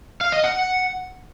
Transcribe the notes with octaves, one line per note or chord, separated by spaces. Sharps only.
F5
D#5
F#5